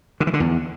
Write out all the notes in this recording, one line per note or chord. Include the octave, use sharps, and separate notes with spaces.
D3
E3
D3
E2